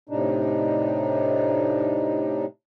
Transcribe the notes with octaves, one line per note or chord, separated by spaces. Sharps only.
A2 C3 D4 D#4